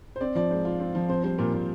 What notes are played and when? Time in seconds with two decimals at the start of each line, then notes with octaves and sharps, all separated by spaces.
0.16 C5
0.21 C4 D5
0.35 F3 D5
0.50 G#2 C5
0.65 F4
0.80 C4
0.95 F3
1.09 C4 C5
1.24 G3 C5
1.38 A#2 A#4
1.54 A#2